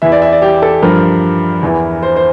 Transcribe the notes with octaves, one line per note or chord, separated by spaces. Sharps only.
E2 E3 E5
D5
E5
D5
G4
A4
G2 F3 A#4
E2 E3
C5
C5